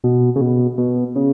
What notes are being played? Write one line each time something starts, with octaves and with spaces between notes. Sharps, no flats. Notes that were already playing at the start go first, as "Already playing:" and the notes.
B2
C#3
B2
B2
C#3